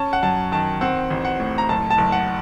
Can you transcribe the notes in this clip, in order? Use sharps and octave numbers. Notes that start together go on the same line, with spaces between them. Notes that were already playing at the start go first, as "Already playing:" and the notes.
Already playing: C#4 A5
F#5
F#2 A5
D#3 A5
C4 F#5
A1
F#5
A2
A#5
F#1 A5
A5
F#1
F#5